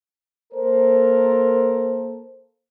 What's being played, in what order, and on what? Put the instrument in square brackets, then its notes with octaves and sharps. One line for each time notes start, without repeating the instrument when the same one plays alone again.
[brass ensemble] A#3 A4 A#4 C5